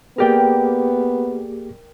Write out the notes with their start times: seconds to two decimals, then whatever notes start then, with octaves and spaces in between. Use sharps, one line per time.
0.18 A#3 B3 G4 G#4 A#4 D5 G5